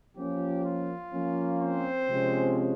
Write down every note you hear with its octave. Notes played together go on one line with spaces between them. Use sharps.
F3 A#3 C#4 G4
F4
F3 A#3 C#4
C4 C5
C3 F3 G#3 C#4